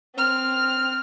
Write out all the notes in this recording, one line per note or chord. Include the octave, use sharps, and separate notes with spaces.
C4 F6